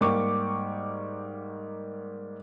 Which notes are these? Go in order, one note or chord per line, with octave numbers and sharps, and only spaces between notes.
G#2 G3 A#3 C#6 D6